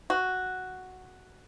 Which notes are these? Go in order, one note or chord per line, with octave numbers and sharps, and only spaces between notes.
F#4